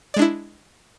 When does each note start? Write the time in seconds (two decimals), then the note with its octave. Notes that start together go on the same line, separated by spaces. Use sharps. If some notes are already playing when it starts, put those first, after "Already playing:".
0.14 D5
0.17 G#3
0.19 D4
0.22 E4